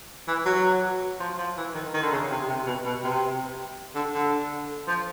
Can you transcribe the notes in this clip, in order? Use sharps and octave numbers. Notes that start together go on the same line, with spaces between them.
E3
F#3
F3
F3
E3
D#3
D#3
D3
C#3
C3
C3
B2
B2
C3
D3
D3
F3